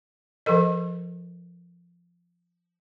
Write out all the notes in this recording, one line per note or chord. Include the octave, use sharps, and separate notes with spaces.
F3 A4 A#4 D#5